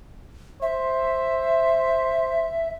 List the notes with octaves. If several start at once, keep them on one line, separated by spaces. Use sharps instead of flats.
C5 E5